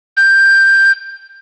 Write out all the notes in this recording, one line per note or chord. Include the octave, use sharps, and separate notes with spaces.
G6